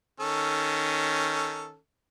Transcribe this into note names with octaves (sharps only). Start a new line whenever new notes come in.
D#3 C#4 A4